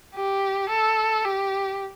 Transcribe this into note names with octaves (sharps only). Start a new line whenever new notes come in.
G4
A4
G4